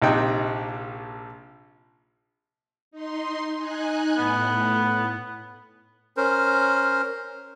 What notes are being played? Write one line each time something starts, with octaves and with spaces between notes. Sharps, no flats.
A#1 C3 D#4 G5 F#6
D#4 C6
D#4 G#5 F#6
A2 B3
C#4 A#4 C5